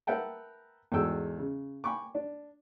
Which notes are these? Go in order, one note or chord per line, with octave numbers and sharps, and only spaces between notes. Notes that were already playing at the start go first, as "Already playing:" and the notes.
A#4 B4 E5 F#5 G5 A5
E2 G#2 F#4 A4 G5 E6
C#3
G5 G#5 B5 C#6 D6
D4